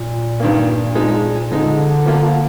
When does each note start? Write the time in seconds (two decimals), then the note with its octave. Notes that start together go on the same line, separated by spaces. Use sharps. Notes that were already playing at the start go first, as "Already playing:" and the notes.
Already playing: A#2
0.40 G2 D#3 A#3
0.95 F3 G#3 D#4
1.51 D3 F3 G#3 D#4
2.06 F3 A#3 F4